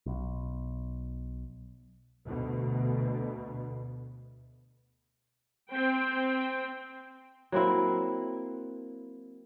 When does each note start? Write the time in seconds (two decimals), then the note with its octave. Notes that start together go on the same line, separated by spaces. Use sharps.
0.06 B1
2.26 D2 B2
5.70 C4 G5
7.52 F#3 A#3 C4 E4